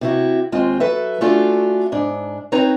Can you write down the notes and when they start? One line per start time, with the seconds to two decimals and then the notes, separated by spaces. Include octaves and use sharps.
0.01 C3 E4 F#4
0.52 D#2 G#3 C4 F4
0.80 F#3 A4 B4 E5
1.21 A3 C#4 D4 F4 F#4 A4
1.92 G#2 D4
2.52 C4 D#4 B4 C#5 A#5